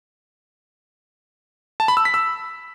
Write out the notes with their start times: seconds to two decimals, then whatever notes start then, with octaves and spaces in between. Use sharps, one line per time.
1.80 A5
1.88 B5
1.97 E6
2.05 B6
2.14 E6